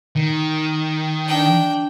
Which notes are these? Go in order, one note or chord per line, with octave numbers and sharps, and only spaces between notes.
D#3
D4 G5